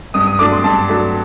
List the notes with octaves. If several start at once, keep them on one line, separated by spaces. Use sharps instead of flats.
G2 D#6
D#6
F#3 A3 D4 D6
C6
G2 A5
F#3 A3 D4